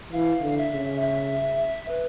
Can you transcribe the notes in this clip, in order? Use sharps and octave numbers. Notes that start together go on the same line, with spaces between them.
E3 F5
D3
E5
C#3
E5
B4